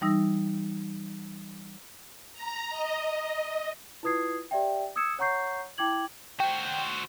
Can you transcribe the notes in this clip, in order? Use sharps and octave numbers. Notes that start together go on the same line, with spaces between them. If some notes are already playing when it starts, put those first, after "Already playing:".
E3 G3 D#4 E6 A#6
A#5
D#5
E4 F4 B4 D#6 G#6 C7
G4 D5 E5 G5
D#6 E6 G#6 C#7 E7
C#5 F#5 A#5 C#6 G6 C7
E4 G5 D6 G#6 F#7
F#4 C5 G5